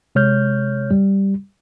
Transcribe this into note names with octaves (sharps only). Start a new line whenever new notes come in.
C3 G#3 C#5 F6 G6
G3